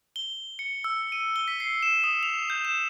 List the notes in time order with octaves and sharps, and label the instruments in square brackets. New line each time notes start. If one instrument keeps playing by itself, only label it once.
[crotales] G7
C#7
E6
D#7
G7
B6
C7
E7
D#6
F7
G6
E7